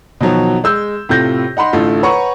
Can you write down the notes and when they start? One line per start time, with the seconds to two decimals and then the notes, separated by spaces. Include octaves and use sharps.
0.21 B2 D#3 F3 F#3
0.64 G#3 E6 G6
1.09 A2 C3 F4 G6 A#6
1.57 D#4 F#5 B5 C6
1.73 A1 D3 A3 E4 F4
2.03 B4 C#5 F#5 A#5 C#6